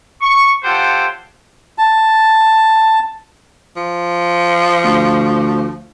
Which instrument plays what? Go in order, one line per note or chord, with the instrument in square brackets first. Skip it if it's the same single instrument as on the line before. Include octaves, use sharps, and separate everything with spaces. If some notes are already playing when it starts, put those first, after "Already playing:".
[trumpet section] C#6
F4 G4 A4 C5 C#5 F#5
[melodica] A5
[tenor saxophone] F3
[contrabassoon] D2